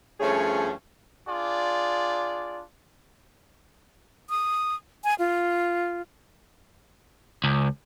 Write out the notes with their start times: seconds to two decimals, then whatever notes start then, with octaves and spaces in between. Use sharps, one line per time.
0.20 G2 F3 A3 C#4 G#4 C#5
1.28 D4 F4 G#4 D5
4.30 D#6
5.04 G#5
5.19 F4
7.44 C#2